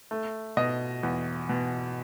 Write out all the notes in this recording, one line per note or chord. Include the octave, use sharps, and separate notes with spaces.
A3
B2 D#5
E2
B2